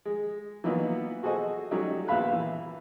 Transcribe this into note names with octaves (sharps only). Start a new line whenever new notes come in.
G#3
E3 F#3 A#3 B3 D#4
F#4 G#4 A4 C5 D#5
F#3 G3 A3 C#4 D#4
A#1 B3 E5 F5 B5 F#6
E3